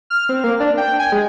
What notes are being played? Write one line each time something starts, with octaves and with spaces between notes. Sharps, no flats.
F6
C4
A#3
D4
G5
G#5
G#3